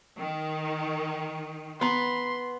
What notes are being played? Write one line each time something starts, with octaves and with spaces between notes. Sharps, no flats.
D#3
B3 A#5 C6